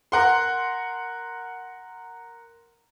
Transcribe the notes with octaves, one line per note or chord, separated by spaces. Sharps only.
A#4 F#5 C6